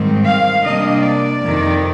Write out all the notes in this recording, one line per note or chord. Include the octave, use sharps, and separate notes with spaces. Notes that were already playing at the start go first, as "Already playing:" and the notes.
Already playing: G#2 D#3 G3 C4
F5
C3 G3 A#3 D4 D#5
D5
F2 C3 D#3